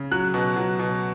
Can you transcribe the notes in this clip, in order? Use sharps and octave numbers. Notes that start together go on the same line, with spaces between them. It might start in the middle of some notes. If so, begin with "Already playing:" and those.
Already playing: C#3
F#3 F#6
B2
F#3
B2